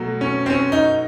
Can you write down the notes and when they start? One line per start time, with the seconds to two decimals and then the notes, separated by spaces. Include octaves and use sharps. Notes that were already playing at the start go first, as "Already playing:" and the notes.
Already playing: B2 F#3 A3
0.21 C#4
0.46 C4
0.50 C#4
0.72 D#4